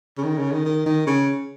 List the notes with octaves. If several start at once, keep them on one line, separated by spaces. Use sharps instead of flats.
C#3
D#3
C#3
D#3
D#3
D#3
C#3